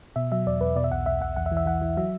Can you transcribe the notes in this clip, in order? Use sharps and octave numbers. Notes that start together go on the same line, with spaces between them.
B2 E5
F#3 E5
E2 D5
E2 B4
B2 D5
E5
B1 F#5
B1 E5
B1 F#5
E2 F#5
E5
E3
E5
E3 F#5
E3
F#3 E5